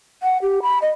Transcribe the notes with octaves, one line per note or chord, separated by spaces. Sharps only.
F#5
G4
B5
D#5